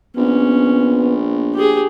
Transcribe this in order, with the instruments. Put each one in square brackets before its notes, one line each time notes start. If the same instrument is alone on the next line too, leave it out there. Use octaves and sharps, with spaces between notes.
[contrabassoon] A#1 [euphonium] B3 [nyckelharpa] C#4
[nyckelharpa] G4 G#4